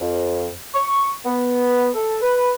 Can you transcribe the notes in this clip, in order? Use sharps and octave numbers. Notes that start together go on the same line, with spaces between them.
F2
C#6
B3
A4
B4